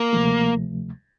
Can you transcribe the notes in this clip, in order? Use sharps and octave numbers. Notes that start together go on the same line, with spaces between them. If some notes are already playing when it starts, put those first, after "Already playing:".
Already playing: A#3
D2 C3 F3 A3